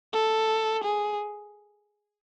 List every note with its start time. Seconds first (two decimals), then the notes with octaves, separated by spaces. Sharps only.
0.13 A4
0.84 G#4